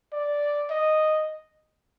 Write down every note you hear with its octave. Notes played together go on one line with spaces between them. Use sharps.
D5
D#5